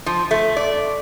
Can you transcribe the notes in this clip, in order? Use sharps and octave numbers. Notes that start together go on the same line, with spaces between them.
F3
A3
D5